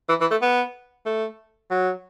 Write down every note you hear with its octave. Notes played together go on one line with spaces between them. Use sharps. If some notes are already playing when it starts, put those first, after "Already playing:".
E3
E3
A3
B3
A3
F#3